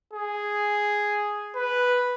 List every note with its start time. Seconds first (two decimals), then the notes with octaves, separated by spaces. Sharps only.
0.13 G#4
1.55 B4